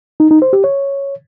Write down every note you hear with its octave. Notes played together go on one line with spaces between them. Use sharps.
D#4
D#4
C5
G4
C#5